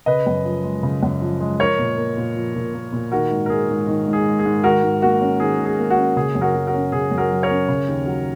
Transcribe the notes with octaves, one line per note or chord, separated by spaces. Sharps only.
C#3 B4 D#5
F#2
F3
G#3
C#3
F#2
F3
G#3
F3 A#4 C#5
A#2
A#3
A#2
F3
A#2
A#3
A#2
D#3 F#4 A#4
G#2
A#4
G#3 G#4
G#2
D#3
G#2
G#4
G#3
G#4
G#2
D#3 F#4 A#4
G#2
A#3 F#4
C#4
D#3 G#4
G#2
G#4
A#3
F#4
C#4
C#3 G#4
F#2
F#4 A#4
F#3
F#4 A#4
C#4
C#3 G#4
F#2
F#4 A#4
F#3
A#4 C#5
C#4
C#3
D#2
F#3